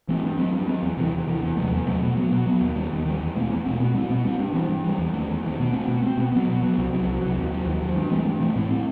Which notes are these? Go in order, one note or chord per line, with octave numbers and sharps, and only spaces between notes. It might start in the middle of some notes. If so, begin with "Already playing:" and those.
E3 A3 C4
G2
F#3 C4
G2
F#3 C4
E2
C3 E3
E2
C3 E3
E2
C3 F#3 A3
E2
C3 F#3 A3
B2
F#3 B3
B2
F#3 B3
D#2
D#3 G3
D#2
D#3 G3
E2
B2 A3 C4
E2
B2 A3 C4
B2
G3 C4
B2
G3 C4
G2
E3 G3
G2
E3 G3
E2
D#3 A3
E2
D#3 A3
B2
A3 C4
B2
A3
C4
B2
F#3 B3
B2
F#3 B3
C2
C3 F#3
C2
C3 F#3
D#2
D#3 F#3
D#2
D#3 F#3
G2
E3 A3 C4
G2
E3 A3 C4
A2
G3 C4